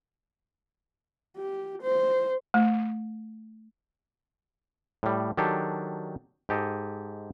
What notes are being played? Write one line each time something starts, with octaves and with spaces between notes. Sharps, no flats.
G4
C5
A3
A2 G3
D#3 F#3 D4 G4 A4
G#2 G4 A4 D#5